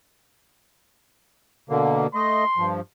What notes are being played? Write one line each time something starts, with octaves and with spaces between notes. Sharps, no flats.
B2 D3 A#3
A3 D#5 C6
G2 F3